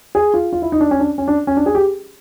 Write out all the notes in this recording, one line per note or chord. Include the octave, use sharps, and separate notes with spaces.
G#4
F4
F4
E4
D#4
D4
C#4
D4
C#4
D4
C#4
D4
G#4
G4